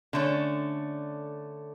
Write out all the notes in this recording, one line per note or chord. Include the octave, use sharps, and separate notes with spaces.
D3 A3 C#4